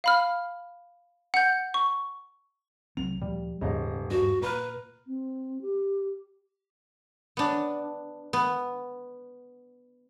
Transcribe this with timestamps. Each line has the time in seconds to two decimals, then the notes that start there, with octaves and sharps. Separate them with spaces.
0.04 F5 B5 F6
1.34 F#5 G6
1.74 C#6
2.97 C2 F#3 C4 F7
3.22 D2 A#2 F3 G3
3.61 D#1 D#2 G#2 C#3 D#5
4.10 G2 F#4
4.42 A#2 B4 A#5 B5 F6
5.07 C4
5.61 G4
7.37 B3 D4
8.33 B3